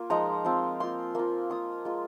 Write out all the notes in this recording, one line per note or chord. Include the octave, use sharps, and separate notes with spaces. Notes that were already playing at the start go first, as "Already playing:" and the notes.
Already playing: A#3 F4
F3 G#3 D#4 A#5
F3 C4 F4
A#3 F4 C6
A#3 F4
A#3 F4 D#6
G#3 F4